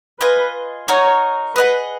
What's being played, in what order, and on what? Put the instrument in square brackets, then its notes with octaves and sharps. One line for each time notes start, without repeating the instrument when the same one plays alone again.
[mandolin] F4 G#4 D#5 [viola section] B4
[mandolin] D#4 F#4 A#4 [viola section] C#5
[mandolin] G#4 D#5 F#5 [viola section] B4